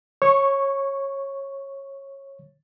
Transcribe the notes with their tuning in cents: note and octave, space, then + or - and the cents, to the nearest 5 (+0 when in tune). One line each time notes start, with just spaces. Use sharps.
C#5 -20 C#6 +0